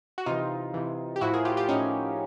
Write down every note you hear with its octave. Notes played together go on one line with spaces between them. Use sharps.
F#4
C3 E3 D#4 F4
C3 E3
G4
A2 F3 E4 F#4
G#4 A#4
F4 G4
F4 G4
A2 F3 C#4 D#4